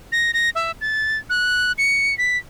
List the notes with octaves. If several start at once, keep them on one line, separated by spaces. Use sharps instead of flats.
A#6
A#6
E5
A6
F#6
C#7
B6